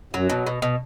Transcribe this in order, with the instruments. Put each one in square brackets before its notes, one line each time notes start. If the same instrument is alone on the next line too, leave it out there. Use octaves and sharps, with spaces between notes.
[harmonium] F#2 [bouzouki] F#3
[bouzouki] B2
B2
B2